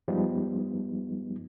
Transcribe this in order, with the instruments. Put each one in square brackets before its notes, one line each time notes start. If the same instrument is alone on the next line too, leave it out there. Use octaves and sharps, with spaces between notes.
[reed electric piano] F#2 F3 G3 G#3 B3 D#4